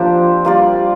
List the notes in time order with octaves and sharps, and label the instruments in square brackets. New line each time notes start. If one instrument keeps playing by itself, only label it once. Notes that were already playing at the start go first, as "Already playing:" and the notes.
Already playing: [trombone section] F3 [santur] A#3 C4 D4 G4 C5
[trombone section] G3 [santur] A#3 F4 D5